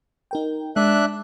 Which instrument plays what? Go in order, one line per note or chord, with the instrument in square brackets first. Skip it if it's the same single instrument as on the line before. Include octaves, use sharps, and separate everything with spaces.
[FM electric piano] D#4 A#4 G5
[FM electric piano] G#3 [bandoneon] D4 E5 F#6